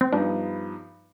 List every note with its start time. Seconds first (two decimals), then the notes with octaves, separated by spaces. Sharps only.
0.01 C4
0.12 G2 F3 B3 D4 D#4